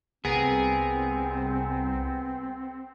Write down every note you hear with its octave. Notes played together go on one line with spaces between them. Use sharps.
C2 B3 C4 G#4 A#4